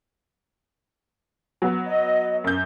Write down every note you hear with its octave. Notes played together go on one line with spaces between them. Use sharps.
F#3 B3
D#5
F#2 G6